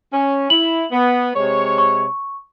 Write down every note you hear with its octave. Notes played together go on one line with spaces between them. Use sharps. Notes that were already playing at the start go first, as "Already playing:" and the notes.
C#4
E4 F#7
B3
C3 G#3 C#5
C#6